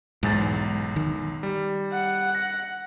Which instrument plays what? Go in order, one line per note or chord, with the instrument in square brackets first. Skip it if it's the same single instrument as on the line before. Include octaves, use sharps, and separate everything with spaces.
[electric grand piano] B1 E2 A6 [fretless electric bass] G#2
[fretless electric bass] D#3
[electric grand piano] G3
[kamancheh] F#5
[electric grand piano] A#6